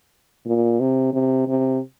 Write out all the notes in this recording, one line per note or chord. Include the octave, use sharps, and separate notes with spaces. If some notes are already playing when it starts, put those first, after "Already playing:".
A#2
C3
C3
C3